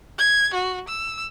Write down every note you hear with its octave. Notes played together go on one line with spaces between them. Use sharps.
G#6
F#4
E6